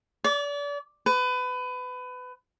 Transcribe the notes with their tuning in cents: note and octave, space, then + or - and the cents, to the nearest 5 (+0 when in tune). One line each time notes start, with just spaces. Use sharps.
D5 -35
B4 +25